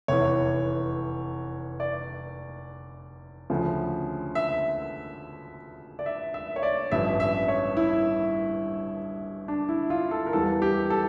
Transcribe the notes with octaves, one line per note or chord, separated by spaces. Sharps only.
F1 E2 E3 C#5
D5
D2 C#3 F3
E5
D5
E5
E5
C#5
D5
A1 G2 F3 E5
E5
C#5
E4
D4
E4
F4
A4
A#4
E2 E3 G3 A4
G4
A4